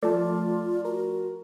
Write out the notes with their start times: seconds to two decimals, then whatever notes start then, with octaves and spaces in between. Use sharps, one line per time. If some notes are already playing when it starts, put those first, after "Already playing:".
0.03 F3 A3 F4 D5 A5
0.85 F#4 A#4